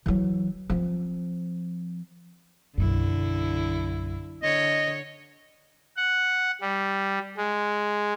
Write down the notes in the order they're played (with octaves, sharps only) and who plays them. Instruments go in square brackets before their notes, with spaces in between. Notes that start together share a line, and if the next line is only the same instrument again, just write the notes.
[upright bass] E3 F#3
F3 C4
[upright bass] B1 F#2 [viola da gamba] D3 E4
[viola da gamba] D3 C#5 [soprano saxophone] D#5
[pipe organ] F#5
G3
G#3